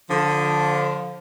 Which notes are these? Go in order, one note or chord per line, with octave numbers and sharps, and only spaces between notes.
D3 F3